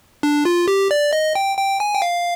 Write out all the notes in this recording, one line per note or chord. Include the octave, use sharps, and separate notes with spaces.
D4
F4
G4
D5
D#5
G5
G5
G#5
G5
F5